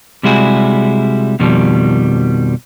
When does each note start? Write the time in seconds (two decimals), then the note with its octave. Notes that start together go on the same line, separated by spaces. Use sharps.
0.23 C3 G3 G#3 E4 F#4 G#4
1.40 F2 B2 D#3 F3 G3